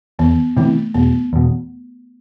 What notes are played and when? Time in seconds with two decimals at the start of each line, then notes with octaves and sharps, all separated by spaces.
0.19 E2 B3
0.57 C3 E3 A3
0.94 E1 B3
1.33 E2 B2